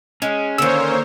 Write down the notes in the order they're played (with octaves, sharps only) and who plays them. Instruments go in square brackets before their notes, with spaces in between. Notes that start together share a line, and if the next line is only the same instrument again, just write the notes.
[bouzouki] G#3 [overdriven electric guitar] C#4
[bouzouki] D3 D#3 [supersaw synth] A#3 C5 C#5 [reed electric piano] E6